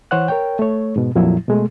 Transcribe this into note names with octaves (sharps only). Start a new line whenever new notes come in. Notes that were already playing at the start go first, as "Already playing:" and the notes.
E3 C5 C#5 F#5 F#6
A#4 C#5 G5
A3 C#5
G#2 B2
F2 A#2 F3 F#3 E4
B2 G#3 A3